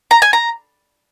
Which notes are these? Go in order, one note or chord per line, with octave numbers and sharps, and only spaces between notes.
A#5
G#5
A#5